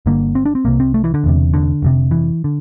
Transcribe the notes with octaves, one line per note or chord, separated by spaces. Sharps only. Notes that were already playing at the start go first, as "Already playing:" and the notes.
G1 G2 D3 A#3
C4
D4
C4
C2 C3 A#3
C4
A3
E3
D3
E1 E2 C3
D3
F1 F2 C3
E3
D3